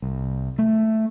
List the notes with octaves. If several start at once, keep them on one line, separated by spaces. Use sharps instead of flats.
C2
A3